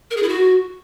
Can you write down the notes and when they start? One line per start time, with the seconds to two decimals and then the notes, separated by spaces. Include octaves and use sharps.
0.11 A#4
0.17 G#4
0.23 E4
0.29 F#4